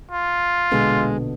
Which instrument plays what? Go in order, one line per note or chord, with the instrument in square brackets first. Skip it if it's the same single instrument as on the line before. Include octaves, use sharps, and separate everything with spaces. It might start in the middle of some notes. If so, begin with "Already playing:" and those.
[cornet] F4
[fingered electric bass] A#1 B2 D3 [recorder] G#3